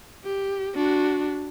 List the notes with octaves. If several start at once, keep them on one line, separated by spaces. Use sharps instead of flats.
G4
D4 F#4